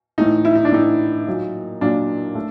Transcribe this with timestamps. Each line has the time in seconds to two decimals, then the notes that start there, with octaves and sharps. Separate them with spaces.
0.18 A2 E3 A3 D#4
0.45 E4
0.55 D#4
0.65 D4
0.72 A2 E3 A3 D#4
1.27 A#2 F#3 A#3
1.81 A#2 F#3 A#3 D4
2.35 A3